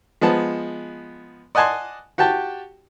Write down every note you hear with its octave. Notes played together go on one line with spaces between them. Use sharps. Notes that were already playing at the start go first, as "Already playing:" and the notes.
F3 G#3 B3 A5
D5 D#5 F#5 G#5 A5 C6
F#4 G4 G5 A5